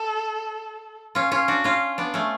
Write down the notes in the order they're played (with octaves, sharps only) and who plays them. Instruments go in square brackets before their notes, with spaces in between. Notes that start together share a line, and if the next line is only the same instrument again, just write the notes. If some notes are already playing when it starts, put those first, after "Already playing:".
Already playing: [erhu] A4
[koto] C#4 F4
C#4 F4
D4 F#4
C#4 F4
B3 D4
A3 C#4